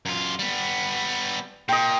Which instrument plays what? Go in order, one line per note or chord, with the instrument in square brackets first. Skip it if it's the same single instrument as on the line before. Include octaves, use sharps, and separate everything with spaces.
[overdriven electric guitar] F#2 F4
G3 B3
[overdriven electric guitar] A#2 [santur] D#5 G5